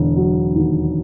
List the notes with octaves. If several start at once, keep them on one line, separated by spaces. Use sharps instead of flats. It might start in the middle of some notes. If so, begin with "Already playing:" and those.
Already playing: E1 D3
F#3
D#2